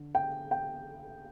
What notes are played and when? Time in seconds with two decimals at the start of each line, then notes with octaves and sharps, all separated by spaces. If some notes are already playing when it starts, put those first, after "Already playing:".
Already playing: D3
0.15 G5
0.51 G5